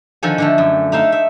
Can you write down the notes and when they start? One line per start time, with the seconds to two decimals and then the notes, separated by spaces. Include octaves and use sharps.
0.23 D3 D#3 F3 A4 G#5
0.38 D3 F3 A3
0.58 F#2
0.92 A3 D#4 E5 F5
1.12 E5